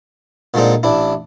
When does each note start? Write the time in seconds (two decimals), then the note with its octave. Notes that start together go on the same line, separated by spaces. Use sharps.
0.54 A#2 D3 G#3 C4 D#4
0.83 A1 D4 E4